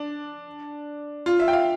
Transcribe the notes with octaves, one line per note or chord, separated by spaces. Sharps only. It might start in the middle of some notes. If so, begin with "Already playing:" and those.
Already playing: D4
F4
E5
G5
F5